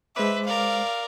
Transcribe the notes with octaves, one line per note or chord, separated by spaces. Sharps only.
G#3 B4 C5 E5 D6
A#4 D5 F5